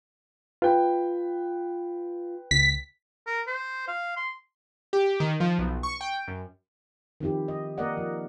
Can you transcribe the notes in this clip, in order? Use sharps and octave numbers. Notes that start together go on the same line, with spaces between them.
F4 B4 G5
C#2 B6
A#4
C5
F5
C6
G4
D#3
F3
B1
C#6
G5
F#2
D#3 F3 C4 E4 G4
D#5
A#3 A#4 D5 D#5 F#5
F3